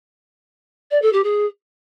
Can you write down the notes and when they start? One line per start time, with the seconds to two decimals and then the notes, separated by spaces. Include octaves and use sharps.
0.91 D5
1.02 A4
1.13 G4
1.24 G#4